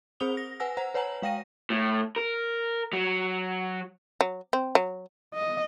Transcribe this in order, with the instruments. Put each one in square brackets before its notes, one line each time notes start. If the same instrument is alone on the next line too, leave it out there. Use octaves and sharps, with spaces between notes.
[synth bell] C4 G#4 C5 D#6 F7 G7
A#6
B4 F#5 G#5 E6 A#6
C5 F#5 A#5
B4 C#5 F#5 G#5 A#5 F#7
G#3 F5 G5 A#6 D#7
[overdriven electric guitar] A2
A#4
F#3
[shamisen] F#3
C4
F#3
[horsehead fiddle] D#5